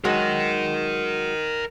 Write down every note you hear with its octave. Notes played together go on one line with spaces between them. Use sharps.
F#3 G#3 F#4 A#4 D#5